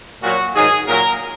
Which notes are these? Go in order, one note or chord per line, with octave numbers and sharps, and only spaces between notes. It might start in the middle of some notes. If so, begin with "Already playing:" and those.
A#2 F#3 F#4
G#2 D#3 F#3 G#4
A#2 F#3 A#4